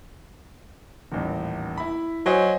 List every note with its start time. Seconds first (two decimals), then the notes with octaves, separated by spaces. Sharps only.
1.12 D#1 A1
1.78 E4 B5
2.26 F#3 C5 D#5 G#5